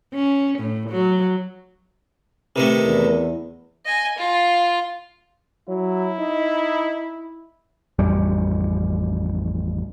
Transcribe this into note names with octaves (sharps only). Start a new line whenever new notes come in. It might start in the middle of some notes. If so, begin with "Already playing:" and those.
C#4
A2
F#3
C3 D#3 A3 A#4 B4
E2
D#5 G#5
F4
F#3 E4
D#4
A1 F2 G3